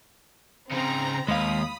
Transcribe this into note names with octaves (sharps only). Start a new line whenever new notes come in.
C#3 C4 D#4 A#5
D#2 G#3 F5 B5 D#6